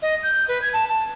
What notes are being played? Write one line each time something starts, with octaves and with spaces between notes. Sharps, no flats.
D#5
G6
B4
G#6
A5
A5